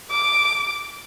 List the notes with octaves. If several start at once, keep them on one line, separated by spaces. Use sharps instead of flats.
D6